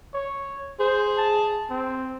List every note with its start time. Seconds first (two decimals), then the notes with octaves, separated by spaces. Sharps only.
0.14 C#5
0.79 G#4 C5
1.17 A5
1.70 C4